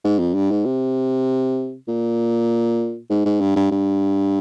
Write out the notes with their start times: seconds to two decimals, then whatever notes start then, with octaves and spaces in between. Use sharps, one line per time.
0.04 G#2
0.19 F2
0.35 G2
0.51 G#2
0.65 C3
1.88 A#2
3.10 G#2
3.25 G#2
3.41 G2
3.56 G2
3.71 G2